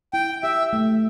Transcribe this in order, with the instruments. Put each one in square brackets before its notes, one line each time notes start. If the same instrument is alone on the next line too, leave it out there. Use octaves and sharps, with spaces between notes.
[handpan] E4 [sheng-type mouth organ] G5
[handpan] G4 [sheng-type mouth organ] E5
[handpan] A3